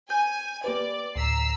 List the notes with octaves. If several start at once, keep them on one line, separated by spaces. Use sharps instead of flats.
G#5 G6
A#3 G4 B4 D5
D2 A2 A#5 E6 B6 C7